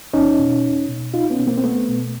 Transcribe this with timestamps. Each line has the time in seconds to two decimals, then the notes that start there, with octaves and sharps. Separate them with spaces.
0.13 E2 C#4 D#4
0.39 B2
0.63 E2
0.89 B2
1.14 C2 D#4 F4
1.30 B3 C#4
1.39 B2
1.47 A#3 C4
1.58 C4
1.63 C2 A3 B3
1.88 B2